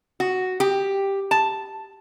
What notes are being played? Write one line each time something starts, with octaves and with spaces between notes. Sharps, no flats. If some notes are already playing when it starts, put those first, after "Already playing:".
F#4
G4
A5